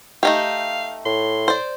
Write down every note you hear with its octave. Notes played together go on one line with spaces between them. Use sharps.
A3 D#4 G4 F5
A2 C6
C5 D5